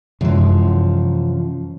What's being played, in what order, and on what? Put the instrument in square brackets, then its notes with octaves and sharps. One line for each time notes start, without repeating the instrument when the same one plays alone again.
[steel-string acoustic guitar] F#2 F3 [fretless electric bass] C3 E3 G#3